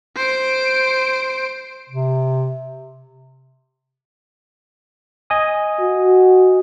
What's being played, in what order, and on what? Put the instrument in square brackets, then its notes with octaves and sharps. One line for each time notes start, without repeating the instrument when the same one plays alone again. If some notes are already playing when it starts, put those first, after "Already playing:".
[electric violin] C5 D7
[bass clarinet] C3
[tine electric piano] D#5 G#5 D#6
[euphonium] F#4